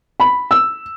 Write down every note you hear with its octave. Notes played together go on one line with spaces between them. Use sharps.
B5
E6